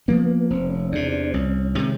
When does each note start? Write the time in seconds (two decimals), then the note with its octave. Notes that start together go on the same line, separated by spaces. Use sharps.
0.08 F3 A#3 B3 C#4
0.50 F1 C4
0.70 C#4
0.92 E2 C3 D4
1.12 D4
1.28 C4
1.34 C2 C#4
1.75 C3 D#3 G#3